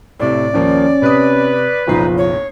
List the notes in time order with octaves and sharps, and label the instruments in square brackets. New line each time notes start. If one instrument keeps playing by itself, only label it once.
[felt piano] A2 C3 [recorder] D5
[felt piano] D#2 F3 A#3 [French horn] C#4
[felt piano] C3 D#6 [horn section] B4
[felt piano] F#1 B1 C7 [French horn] F3 [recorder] D#4
[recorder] C#5